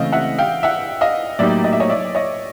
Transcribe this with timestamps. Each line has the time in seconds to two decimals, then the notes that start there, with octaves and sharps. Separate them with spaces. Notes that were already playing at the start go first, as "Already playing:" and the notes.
Already playing: C#2 C#3 E3 A3 C4 D#5 F5
0.12 E5 F#5
0.38 F5 G5
0.63 E5 F#5
1.01 D#5 F5
1.39 A2 F#3 A#3 D#4 G4 D5 E5
1.64 D#5
1.73 E5
1.80 C#5 D#5
1.90 D5 E5
2.15 C#5 D#5